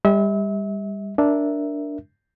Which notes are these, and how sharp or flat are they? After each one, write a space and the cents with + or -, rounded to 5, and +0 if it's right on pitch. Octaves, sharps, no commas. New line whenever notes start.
G3 +30 E5 -35
D4 -5 A#4 +0 E5 +0